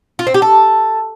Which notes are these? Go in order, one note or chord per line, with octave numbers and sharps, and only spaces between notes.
F4
C4
G4
A4